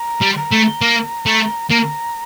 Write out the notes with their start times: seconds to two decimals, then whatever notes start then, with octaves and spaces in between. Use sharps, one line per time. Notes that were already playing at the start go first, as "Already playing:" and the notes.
Already playing: A#5
0.22 G3
0.33 C6
0.37 A#5
0.52 A3
0.82 A#3
1.26 A3
1.70 A#3 A#5